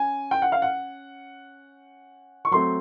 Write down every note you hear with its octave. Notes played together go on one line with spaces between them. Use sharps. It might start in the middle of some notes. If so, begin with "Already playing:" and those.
Already playing: C#4 G#5
G5
F#5
F5
F#5
C#6
F#3 A3 C4 C6